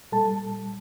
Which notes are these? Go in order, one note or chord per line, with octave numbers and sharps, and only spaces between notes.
A#2 G3 A4 A5